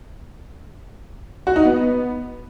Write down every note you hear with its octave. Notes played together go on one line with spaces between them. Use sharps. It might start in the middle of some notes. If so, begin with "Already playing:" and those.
F#4
D#4
B3